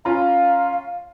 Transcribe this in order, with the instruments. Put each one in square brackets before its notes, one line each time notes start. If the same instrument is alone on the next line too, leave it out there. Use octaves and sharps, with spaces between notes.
[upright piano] C#4 F4 A#5 [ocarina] F5